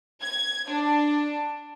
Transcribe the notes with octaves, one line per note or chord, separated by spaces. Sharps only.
G#6
D4